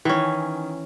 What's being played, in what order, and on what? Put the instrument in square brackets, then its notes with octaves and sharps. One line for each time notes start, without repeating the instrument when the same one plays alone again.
[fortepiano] D#3 [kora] E3 C#4